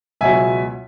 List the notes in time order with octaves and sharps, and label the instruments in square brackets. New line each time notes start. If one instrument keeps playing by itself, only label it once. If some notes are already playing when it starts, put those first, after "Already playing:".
[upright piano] C#2 B2 F#3 E5 G#5